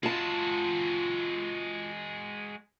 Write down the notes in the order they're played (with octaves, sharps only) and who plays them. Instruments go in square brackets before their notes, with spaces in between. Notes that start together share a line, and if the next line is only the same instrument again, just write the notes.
[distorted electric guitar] G#3 F#4 [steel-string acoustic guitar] F4 A5